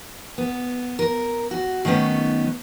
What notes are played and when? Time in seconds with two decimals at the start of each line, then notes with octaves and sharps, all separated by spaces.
0.38 B3
0.99 A#4
1.51 F#4
1.85 D#3 F#3 A3 B3 C#4